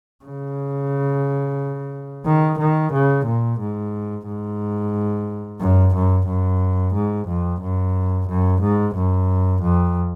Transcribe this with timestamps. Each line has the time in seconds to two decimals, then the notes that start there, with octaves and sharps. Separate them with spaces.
0.25 C#3
2.26 D#3
2.59 D#3
2.93 C#3
3.26 A#2
3.60 G#2
4.27 G#2
5.61 F#2
5.95 F#2
6.27 F#2
6.95 G#2
7.28 F2
7.62 F#2
8.28 F#2
8.62 G#2
8.96 F#2
9.62 F2